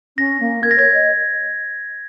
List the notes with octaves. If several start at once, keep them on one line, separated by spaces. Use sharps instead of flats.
C#4 A#6
A#3
A#4 G#6
A#6
C#5 G#6
D#5